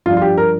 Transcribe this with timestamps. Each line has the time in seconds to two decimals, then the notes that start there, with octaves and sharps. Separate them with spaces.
0.06 G2 F3 D4 F4
0.17 F4
0.22 G4
0.38 A#4